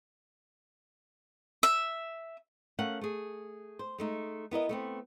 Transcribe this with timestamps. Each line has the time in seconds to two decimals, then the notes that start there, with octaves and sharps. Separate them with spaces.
1.63 E5
2.79 A3 C#4 A#4 F5 F#5
3.01 A3 G#4
3.79 C5
3.98 G#3 A3 D#4
4.51 B3 E4 A#4 D#5
4.69 A3 B3 C4